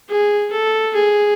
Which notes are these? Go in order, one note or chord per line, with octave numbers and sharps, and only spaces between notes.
G#4
A4
G#4